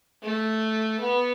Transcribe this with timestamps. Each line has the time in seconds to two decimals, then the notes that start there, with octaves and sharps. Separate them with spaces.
0.23 A3
1.00 B3